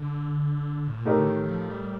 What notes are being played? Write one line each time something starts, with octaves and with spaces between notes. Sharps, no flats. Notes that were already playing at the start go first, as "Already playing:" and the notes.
Already playing: D3
A2
A#2
A2 C3 A3 D#4 G4 A#4
D3
D#3
D#3
F3
G3